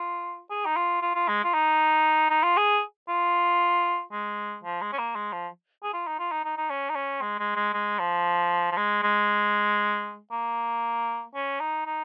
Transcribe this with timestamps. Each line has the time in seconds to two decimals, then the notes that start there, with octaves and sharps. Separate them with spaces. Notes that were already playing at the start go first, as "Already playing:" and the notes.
Already playing: F4
0.50 G#4
0.65 D#4
0.76 F4
1.02 F4
1.15 F4
1.28 G#3
1.44 F4
1.54 D#4
2.30 D#4
2.43 F4
2.57 G#4
3.09 F4
4.12 G#3
4.64 F3
4.81 G#3
4.93 C#4
4.99 A#3
5.15 G#3
5.32 F3
5.83 G#4
5.93 F4
6.07 D#4
6.19 F4
6.32 D#4
6.45 D#4
6.57 D#4
6.70 C#4
6.90 D#4
6.95 C#4
7.21 G#3
7.39 G#3
7.55 G#3
7.73 G#3
7.99 F3
8.72 F3
8.77 G#3
9.02 G#3
10.31 A#3
11.35 C#4
11.60 D#4
11.86 D#4